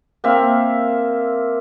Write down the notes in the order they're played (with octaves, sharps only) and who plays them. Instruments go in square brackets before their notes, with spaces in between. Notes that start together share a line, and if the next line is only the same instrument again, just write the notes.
[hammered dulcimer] A#3 C4 E5 F5